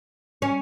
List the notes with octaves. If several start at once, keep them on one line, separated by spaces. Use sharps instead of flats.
C#4